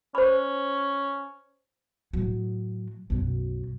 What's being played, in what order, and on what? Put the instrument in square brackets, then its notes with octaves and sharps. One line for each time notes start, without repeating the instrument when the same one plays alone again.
[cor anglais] C#4 [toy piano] C5 B5
[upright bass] A2 F#3
B1 F#2